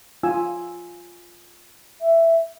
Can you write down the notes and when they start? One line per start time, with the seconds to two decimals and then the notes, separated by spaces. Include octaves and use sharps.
0.23 F4 G#5 E6
2.01 E5